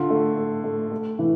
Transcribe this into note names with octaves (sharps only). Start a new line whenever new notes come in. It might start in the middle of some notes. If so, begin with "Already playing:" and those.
Already playing: D3 F4
A3
A3
A3
A3
E3